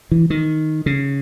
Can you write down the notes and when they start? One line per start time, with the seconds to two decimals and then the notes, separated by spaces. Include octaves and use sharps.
0.11 E3
0.30 D#3
0.86 C#3